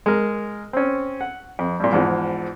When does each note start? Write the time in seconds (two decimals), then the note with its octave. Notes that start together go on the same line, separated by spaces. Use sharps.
0.06 G#3 A#4
0.73 C4 C#4
1.21 F#5
1.59 F2
1.80 G2 A#2
1.92 E2 G#2 F3